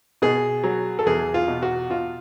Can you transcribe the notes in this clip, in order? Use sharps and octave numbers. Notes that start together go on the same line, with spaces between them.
B2 G#4
F#3
A4
E2 G#4
F4
B2
F#4
B2 F4